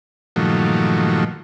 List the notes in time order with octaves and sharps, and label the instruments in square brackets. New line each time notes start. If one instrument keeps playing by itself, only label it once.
[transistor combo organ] G2 A#2 D#3 F3 F#3 A3